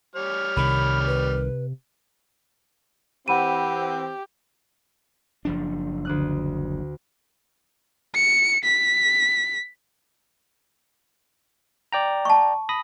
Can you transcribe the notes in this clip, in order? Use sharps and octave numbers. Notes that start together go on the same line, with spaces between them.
G3 C#5 F6
C2 C3 D#3 B5
B4
E3 C4 G4 F#5 B5 D#7
F#1 F3 D4
D2 D#6 F#6
C#7
B6
D5 G5 A#5
A5 C#6
B5 D#6 A#6